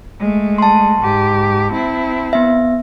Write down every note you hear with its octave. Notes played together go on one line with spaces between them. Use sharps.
G#3 A3
A5 C6
G#2 G4
C4 E4
B3 E5